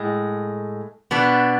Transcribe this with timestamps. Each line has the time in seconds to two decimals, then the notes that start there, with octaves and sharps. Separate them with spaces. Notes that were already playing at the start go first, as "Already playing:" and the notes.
Already playing: A2 G#3
1.11 B2 B3 D4